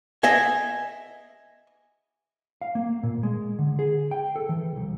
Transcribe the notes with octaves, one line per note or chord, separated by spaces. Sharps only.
D#5 E5 G#5
F5
A#3
A#2
G#3
D3
G#4
G5
A4
E3
C2